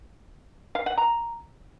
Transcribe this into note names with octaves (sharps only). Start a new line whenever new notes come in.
F5
F#5
A#5